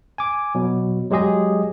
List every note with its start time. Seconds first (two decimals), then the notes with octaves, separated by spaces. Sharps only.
0.18 G#5 D6
0.55 B2 F#3
1.10 F#3 G#3 G4 G#4 D#5